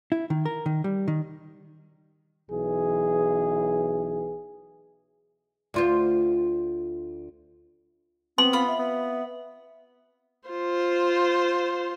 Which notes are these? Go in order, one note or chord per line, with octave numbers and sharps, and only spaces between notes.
E4
D#3
A#4
D#3
G3
D#3
B1 E3 G#4
D2 F4 C5
B3 C4 C6 D#6
F4 B5 D#6
E5
B3
F4 C5